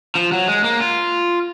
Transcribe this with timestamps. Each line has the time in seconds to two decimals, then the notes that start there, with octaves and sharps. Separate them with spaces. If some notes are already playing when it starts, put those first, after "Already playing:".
0.15 F3
0.32 F#3
0.48 G#3
0.64 A#3
0.80 F4